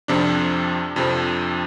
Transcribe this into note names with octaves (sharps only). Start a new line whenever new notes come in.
F2 C3 F3 D4
F2 C3 F3